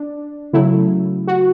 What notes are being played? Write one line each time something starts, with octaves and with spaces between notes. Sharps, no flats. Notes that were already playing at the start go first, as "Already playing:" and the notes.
Already playing: D4
C#3 F#3 A3 E4
F#4